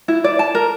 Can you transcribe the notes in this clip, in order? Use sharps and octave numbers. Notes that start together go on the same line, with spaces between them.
E4
D5
A5
A#4